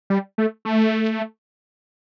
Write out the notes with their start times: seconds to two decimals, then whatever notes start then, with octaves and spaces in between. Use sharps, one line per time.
0.10 G3
0.38 A3
0.65 A3